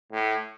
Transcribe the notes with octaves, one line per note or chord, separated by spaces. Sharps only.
A2